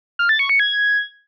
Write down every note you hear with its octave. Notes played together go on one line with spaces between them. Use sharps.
F6
A6
C#6
C#7
G#6